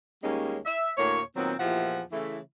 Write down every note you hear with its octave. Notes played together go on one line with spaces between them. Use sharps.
D#2 G3 G#3 A#3 C#4
E5
D2 A2 A#3 C#5
A#2 D#3 F#3 B3 C4
E2 A#2 F3 E4 G4 F#5
C#3 E3 A3 E4